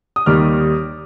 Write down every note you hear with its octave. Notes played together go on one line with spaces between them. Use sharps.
D#6
D#2 D#3 G3 D6 F6